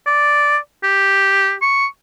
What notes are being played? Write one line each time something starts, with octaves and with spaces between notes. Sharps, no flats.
D5
G4
C#6